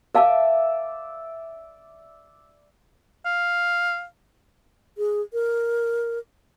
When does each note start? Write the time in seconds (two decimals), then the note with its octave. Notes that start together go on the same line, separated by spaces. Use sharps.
0.15 A#4 D5 E5 F5 A5
3.25 F5
4.98 G#4
5.33 A#4